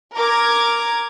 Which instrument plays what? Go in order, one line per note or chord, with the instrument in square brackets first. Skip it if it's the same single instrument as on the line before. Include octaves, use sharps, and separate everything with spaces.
[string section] A#4 A#5 D6 G#6